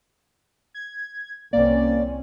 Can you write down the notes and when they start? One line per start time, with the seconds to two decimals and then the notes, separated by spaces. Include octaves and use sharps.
0.74 G#6
1.53 C2 A#3 C4 C#4 D5